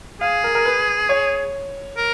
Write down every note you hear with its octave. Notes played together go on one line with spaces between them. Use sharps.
G#4 F5
A#4
A#4
B4
C#5
A#4